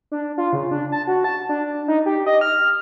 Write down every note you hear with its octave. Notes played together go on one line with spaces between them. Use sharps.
D4
F4
C#3
D4
A5
F#4
A5
D4
D#4
G4
D#5
F6